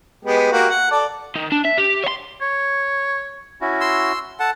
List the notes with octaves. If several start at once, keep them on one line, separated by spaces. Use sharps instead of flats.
G#3 B3 G4
A#3 F#4 G4
F#5
A4 D5
D#3
D4
E5
G4
C#5 C6
C#5
C#4 E4 F#4
C6 E6
A4 F#5 A5